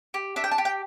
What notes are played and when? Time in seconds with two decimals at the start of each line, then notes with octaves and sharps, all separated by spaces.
0.14 G4
0.36 D4 E5
0.44 G5
0.51 A5
0.58 G4
0.65 G5